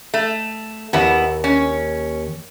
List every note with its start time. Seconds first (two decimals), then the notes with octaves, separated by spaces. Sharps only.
0.14 A3
0.93 D#2 B3 E4
1.44 C#4